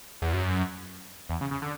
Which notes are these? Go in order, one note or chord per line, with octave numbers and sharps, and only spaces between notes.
E2
F#2
E2
C#3
C#3
D3